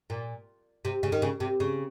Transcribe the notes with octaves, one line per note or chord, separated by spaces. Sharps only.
A#2
C3
C#3
D#3
C#3
C3
C#3